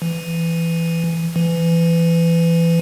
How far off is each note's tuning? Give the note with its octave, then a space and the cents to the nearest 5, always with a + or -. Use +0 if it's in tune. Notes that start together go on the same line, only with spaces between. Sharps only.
E3 +15
E3 +25